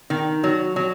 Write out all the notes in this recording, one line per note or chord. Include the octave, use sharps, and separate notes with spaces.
D#3
F#3
F#3